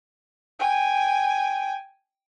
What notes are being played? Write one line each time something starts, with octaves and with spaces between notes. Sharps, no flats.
G5 G#5